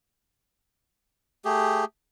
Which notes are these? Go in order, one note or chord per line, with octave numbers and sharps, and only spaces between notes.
A3 G4 G#4